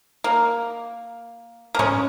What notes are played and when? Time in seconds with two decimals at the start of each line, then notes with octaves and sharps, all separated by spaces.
0.24 A#3
1.75 A#3
1.79 G#3 C#4